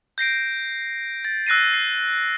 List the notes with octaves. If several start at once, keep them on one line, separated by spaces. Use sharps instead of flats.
G6 A#6 C7 D7
A6
E6 F#6 A#6 C7 D#7
C7